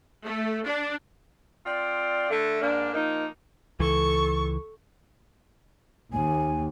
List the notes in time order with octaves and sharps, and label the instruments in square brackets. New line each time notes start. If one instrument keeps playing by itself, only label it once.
[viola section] A3
D4
[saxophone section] C4 F4 D5
D3 A3
G#2 A#3 D4
F3 A#3 D#4
[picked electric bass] C#2 E3 [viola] A4 C#6
[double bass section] D#2 [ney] G#5